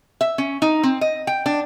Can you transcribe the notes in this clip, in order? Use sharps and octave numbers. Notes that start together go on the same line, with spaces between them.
E5
C#4
D#4
C4
D#5
G5
D4